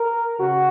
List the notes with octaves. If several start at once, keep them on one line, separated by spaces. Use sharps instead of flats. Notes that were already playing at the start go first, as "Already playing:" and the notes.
Already playing: A#4
C#3 F#4